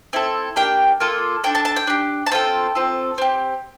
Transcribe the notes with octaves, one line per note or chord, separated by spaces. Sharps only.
C4 E4 A4
A#3 D4 G4 G5
A#3 F4 A4
D4 A4 G5
A5
A5
G5
D4 G4
A5
C4 F4 A4 G5
C4 F4 A4
C4 G4